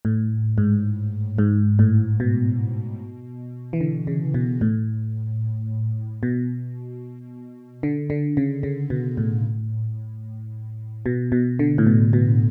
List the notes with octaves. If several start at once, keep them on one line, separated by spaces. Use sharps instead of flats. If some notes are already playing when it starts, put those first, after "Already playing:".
A2
G#2
G#2
A2
B2
E3
D3
C#3
B2
A2
B2
D3
D3
C#3
C#3
B2
A2
B2
B2
D3
A2
B2
B2